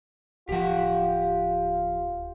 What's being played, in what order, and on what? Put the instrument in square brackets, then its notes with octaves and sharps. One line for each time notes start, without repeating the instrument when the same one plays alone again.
[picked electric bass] D1 F3 [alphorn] F4 [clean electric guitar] G4 F#5